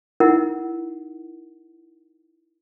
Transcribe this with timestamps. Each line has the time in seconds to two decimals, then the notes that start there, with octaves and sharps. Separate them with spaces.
0.20 D#4 E4 A#4 F#5